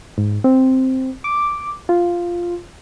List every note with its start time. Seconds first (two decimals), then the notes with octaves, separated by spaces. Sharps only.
0.18 G#2
0.44 C4
1.24 D6
1.89 F4